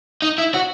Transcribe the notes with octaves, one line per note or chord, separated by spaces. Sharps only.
D#4
E4
F#4